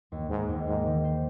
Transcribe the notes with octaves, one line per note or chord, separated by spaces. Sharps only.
D#2
D#2 G#2
D#2
G#2 A#3
D#3
C5